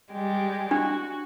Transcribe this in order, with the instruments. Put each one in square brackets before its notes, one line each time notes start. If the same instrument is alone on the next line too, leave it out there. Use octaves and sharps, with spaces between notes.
[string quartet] G3 G#3 G4
[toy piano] D4 [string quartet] F#4